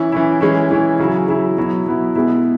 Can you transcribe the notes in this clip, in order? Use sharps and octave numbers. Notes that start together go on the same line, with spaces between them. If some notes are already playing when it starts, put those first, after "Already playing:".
Already playing: E3 C#4 E4
E3 C#4 E4
E3 G#3 C#4 E4
E3 G#3 C#4 E4
C#3 F#3 E4
C#3 F#3 E4
B2 F#3 B3 E4
B2 F#3 B3 E4
B2 G#3 B3 E4